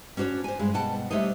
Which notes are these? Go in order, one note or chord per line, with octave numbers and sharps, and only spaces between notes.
C#4 D4 F#4 C5 C#5
C5 G#5
G2 G#3
B2 F#5 G5 A5
G3 A3 D4 C5 C#5 D#5